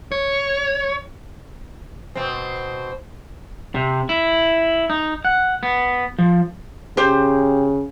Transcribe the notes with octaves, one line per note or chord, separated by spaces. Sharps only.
C#5
B2 C4
C3
E4
D#4
F#5
B3
F3
C#3 G4 C5